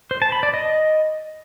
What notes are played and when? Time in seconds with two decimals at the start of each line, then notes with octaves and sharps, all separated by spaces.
0.11 C5
0.22 A5
0.32 B5
0.43 D5
0.54 D#5